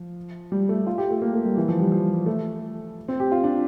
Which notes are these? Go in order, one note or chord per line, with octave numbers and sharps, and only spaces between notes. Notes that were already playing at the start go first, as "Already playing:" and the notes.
Already playing: F3
G3
A3
F4
G4
A3
A#3
A3
G3
E3
F3
G3
F3
A3
C4
G4
F4
D4